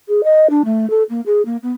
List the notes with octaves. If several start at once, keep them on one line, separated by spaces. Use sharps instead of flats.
G#4
D#5
D4
A3
A4
A#3
G#4
A#3
B3